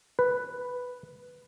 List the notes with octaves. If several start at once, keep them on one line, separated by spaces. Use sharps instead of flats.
B4